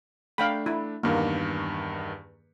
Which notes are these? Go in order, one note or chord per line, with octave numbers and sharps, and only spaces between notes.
A3 D4 F5 G5 B5
E4
E2 G2 D#3 A#3